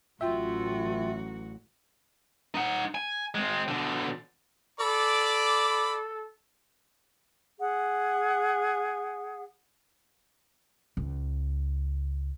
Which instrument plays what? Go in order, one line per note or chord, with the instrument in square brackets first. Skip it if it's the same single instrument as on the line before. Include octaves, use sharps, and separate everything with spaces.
[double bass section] A1 [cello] F#3 F#4 [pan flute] F4 [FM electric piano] E5 G5
[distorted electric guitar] D#4 F#5
G#5
G#3 C4
B2 D3
[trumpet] A4 [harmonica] D5 B5 D6
[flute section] G#4 F#5
[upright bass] C#2